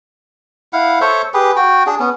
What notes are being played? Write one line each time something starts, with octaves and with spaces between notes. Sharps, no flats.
E4 F5 F#5
A4 C5 C#5 E5
G4 G#4 B4
F#4 G5
D4 G#4
B3 C#4